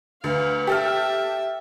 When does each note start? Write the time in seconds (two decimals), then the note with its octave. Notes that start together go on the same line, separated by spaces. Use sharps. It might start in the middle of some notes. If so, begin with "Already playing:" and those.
0.24 D2 B4 F5
0.67 G4 A4 E5 F6